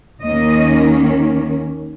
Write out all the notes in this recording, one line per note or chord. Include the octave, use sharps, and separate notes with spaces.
D#2 D#3 A#3 C#4 D#5